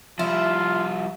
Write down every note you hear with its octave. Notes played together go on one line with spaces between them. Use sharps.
F3 G3 E4 F4